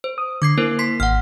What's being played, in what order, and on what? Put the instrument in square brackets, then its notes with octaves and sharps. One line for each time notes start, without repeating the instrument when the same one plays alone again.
[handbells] C5
[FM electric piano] D#6
[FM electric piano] D3 [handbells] D6 G#6 C7
[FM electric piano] A#3 [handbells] E4 A#4 C5
[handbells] C6 B6 C7
[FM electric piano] G#1 [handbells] F#5 F6